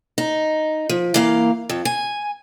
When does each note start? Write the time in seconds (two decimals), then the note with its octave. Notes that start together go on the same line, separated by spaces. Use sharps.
0.18 D#4
0.89 F3
1.14 E3 A#3 F5
1.70 F2
1.85 G#5